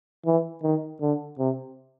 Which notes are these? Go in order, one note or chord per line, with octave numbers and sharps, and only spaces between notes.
E3
D#3
D3
C3